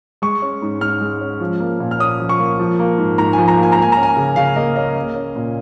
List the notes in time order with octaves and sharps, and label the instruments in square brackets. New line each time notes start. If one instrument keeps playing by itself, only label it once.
[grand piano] G#3 C#6
C#4
G#2
G#2 F6
G#3
C#4
F3
A#3
A#2
F6
C#4 D#6
F3
C#6
A#3
F3
A#3
G#2
G#2 A#5
F3 G#5
A#5
A#3
G#5
A#5
A#3
G#5
C#4 A#5
G#5
C#3
G#5
C#3 F5
A#3 D#5
C#4 D#5
A#3
C#4
A#2